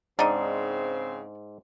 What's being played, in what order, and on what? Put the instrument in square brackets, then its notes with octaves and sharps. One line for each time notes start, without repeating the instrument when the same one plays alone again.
[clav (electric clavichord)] G#2 [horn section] C#3 C4 [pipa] D4 D#4